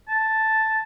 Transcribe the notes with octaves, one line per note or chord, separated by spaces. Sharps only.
A5